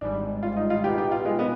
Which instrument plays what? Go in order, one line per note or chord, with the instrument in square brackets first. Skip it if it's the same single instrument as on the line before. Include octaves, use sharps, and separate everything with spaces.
[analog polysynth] G#1 G#2 G3 [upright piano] D4
[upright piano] F4
D#4
F4
[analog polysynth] B2 B3 D#4 [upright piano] G4
[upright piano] G4
F4
G#3
B3